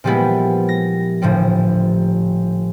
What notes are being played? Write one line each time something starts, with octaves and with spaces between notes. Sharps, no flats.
A#2 F3 G3 G#3 B3 E4
A#6
G1 A2 F3 G3